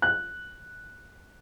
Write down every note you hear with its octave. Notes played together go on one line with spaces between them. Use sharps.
F#6